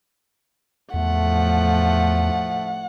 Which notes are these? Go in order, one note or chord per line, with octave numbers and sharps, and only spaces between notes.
E2 A2 F3 A3 F#5